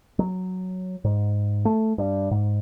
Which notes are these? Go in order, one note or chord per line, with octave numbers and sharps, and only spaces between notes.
F#3
G#2
A3
G2
G#2